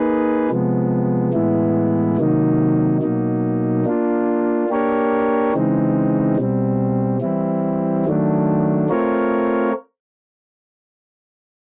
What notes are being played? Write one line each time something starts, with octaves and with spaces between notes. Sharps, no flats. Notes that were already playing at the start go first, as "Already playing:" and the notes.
Already playing: A#3 D#4 G#4 B4
C3 F3 G#3 B3
A2 E3 G#3 B3 E4
C3 D#3 F#3 A#3 D#4
B2 F#3 A#3 D#4
A#3 D4 F4
A#3 D4 G4 A#4 C#5
C#3 E3 G#3 C4 D#4
B2 G3 C4
E3 G3 C4 E4
D#3 F#3 A3 D4
A3 C4 F4 A#4 C#5